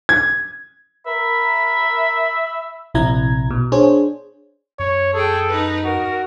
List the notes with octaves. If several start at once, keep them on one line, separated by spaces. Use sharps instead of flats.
G#6
A#4 E5 B5
A#1 C3 E4 A#5 G#6
B2
D4 G#4 C5 C#5
F#2 C#5
G#4 A4 G5
D#4 B4
F#4 A#4